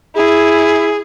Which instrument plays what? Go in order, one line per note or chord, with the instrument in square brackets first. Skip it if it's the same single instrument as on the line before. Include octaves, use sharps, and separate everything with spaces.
[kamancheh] E4 [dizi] G#4